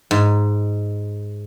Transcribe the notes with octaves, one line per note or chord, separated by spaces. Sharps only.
G#2